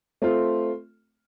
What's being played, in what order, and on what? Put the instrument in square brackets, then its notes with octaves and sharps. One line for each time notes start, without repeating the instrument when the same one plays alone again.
[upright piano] A3 C4 F4